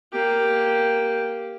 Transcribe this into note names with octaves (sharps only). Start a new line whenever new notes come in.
A#3 G4